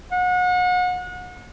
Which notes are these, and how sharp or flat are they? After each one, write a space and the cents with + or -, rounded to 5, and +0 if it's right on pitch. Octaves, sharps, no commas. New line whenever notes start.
F#5 -35